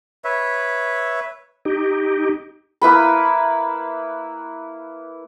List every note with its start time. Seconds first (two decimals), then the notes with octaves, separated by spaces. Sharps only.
0.24 B4 C#5 E5
1.65 D#4 G4
2.81 A#3 E4 B4 B5